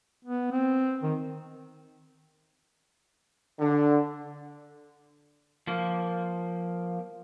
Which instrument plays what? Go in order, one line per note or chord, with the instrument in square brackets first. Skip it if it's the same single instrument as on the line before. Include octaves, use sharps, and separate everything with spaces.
[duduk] B3
C4
D#3
[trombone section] D3
[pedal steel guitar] F3 A#3